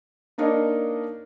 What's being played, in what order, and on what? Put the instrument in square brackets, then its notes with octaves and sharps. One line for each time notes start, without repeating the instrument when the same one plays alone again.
[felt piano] A#3 D4 D#4 A#4 C#5 D#5